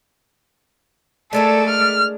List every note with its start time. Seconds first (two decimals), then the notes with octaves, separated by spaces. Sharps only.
1.33 G#3 A3 D4 A4 A#4 D5
1.69 F6